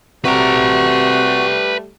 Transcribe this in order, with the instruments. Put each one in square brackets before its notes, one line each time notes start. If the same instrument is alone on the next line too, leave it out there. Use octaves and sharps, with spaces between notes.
[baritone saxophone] C3 [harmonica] G3 A3 [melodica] F#4 [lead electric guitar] B4 A#5